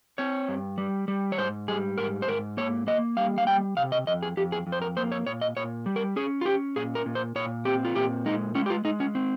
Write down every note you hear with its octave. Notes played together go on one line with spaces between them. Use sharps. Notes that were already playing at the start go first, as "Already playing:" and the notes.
C4 C#5
G2
G3
G3
C#5
G#2 C5
G3 G#4
G#2 A#4
C5
G#2 A#4
A#3 C#5
A#3 D#5
G3 F5
F5
G3 G5
C3 F5
D#5
F2 D#5
G#4
F2 G4
G#4
F2
C5
A#4
A#3 C5
C#5
A#2 C#5
D#5
A#2 C#5
G3
A#4
C#4 G#4
F4
C#4 G4
A#2 G#4
A#4
A#2
C5
A#2 C#5
C4 G4
F4
A#2 G4
G#3 D#4
G#3 C#4
G4
F4
G#3 D#4
C#4
C4